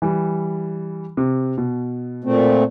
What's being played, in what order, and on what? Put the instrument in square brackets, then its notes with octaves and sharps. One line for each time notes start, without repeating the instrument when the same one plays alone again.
[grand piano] E3 G3
C3
B2
[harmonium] A#2 A3 C4